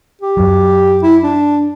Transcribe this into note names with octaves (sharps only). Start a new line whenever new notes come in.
G4
F#2 F#3
E4
D4